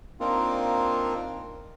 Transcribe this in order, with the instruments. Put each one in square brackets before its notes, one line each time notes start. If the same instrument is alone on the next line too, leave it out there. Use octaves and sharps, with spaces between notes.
[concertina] A#3 C4 D4 D#4 F4 A#4